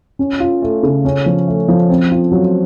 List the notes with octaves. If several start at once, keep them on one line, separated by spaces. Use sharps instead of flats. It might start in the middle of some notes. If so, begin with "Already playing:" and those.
C#4
F4
A3
C#3
C#4
F3
A3
F3
C4
F4
F#3